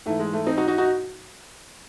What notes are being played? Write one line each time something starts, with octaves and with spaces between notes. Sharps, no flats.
G#2 E3 A3
G#3
A3
C4 D#4
D#4 F#4
D#4 F#4
D#4 F#4